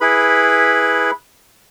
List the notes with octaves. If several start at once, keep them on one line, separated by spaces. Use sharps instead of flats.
E4 G#4 B4 B5